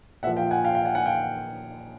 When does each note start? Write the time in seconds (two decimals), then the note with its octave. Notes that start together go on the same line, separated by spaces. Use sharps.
0.23 A#2 E5 F#5
0.27 F3
0.37 F5 G5
0.51 F#5 G#5
0.65 F5 G5
0.75 F5 G5
0.85 F#5 G#5
0.95 F#5 G#5
1.06 F5 G5